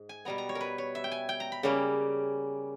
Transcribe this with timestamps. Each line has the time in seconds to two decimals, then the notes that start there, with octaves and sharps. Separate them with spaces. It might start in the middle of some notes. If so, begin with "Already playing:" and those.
Already playing: G#2
0.09 G#5
0.25 B2 G3 B3 A#5
0.38 A#5
0.49 C#5
0.55 A#4
0.61 B4
0.78 C#5
0.95 E5
1.04 G5
1.12 G#5
1.29 G5
1.40 A#5
1.52 B5
1.63 C#3 G3 A#3 C#4